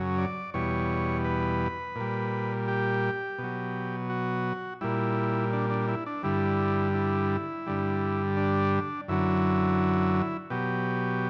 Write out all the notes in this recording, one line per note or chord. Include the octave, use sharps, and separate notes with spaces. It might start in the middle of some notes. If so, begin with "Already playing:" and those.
Already playing: F#2 C#3 F#3
D5
E2 B2 G3 C#5
B4
A#2 G3
G4
B2 F#3
F#4
A#2 G3 E4
D4
D4
E4
D4
G2 D3 G3 E4
E4
G2 D3 G3
D4
F#2 D3 F#3 E4
B2 F#3 G4